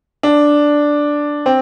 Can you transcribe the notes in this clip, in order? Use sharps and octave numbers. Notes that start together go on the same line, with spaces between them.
D4
C4